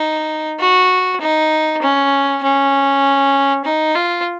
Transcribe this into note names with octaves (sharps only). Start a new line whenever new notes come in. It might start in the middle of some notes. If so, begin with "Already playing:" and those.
Already playing: D#4
F#4
D#4
C#4
C#4
D#4
F4